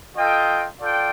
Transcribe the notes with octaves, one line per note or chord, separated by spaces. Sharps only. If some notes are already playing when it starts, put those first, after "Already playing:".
F4 A4 D#5 G5
F4 A4 D5 G5